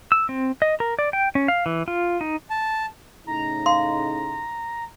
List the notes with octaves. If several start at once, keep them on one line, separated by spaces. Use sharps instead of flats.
E6
C4
D#5
A#4
D5
G5
C#4
F5
E3
F4
D#4
A5
A2 C#3 D#4 A#5
F5 C6